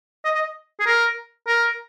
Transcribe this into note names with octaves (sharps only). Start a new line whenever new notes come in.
D#5
D#5
G#4
A#4
A#4